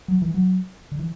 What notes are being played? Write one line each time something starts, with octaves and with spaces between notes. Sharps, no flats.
F#3
E3
F#3
D3
E3